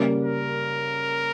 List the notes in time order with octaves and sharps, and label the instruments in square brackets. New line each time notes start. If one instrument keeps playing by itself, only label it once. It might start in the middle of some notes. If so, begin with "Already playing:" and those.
Already playing: [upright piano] C#3 G3 A#3
[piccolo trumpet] A#4